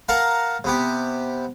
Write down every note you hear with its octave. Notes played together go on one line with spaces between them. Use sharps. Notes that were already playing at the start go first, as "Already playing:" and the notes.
A#4 F5 F#5 A5 A#5
C3 B3 G4